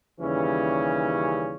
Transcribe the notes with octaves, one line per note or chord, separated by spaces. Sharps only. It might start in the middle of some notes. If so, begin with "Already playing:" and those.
D#2 C#3 E3 G3 C#4